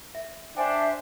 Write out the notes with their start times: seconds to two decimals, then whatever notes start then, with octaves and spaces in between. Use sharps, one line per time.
0.15 E5
0.57 D4 C5 E5 G5 G#5